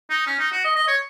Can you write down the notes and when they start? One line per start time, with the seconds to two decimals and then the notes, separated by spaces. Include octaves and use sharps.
0.10 D#4
0.27 C#4
0.39 D#4
0.52 F#4
0.64 D#5
0.75 D#5
0.88 C#5